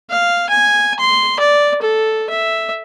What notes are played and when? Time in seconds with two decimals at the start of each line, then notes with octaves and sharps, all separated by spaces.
0.10 F5
0.49 G#5
0.99 C6
1.39 D5
1.82 A4
2.29 E5